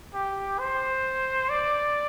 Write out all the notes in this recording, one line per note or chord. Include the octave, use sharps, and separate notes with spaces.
G4
C5
D5